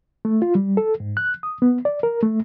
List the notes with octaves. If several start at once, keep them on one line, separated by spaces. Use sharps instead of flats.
A3
F4
G3
A4
G#2
F#6
D#6
B3
D5
A#4
A3